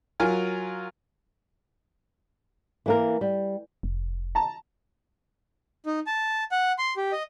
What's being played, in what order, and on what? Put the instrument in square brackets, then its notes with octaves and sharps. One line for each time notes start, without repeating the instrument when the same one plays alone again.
[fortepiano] F#3 F4 A#4 G#5 F6
[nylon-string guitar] E3 A#3 A#4
G3
[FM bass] F1
[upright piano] A5 A#5
[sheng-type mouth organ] D#4
A5
F#5
C6
G4
D#5